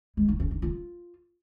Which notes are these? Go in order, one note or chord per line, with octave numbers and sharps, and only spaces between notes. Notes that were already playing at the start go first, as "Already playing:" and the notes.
G#3
D#4
C#4
D#4
F4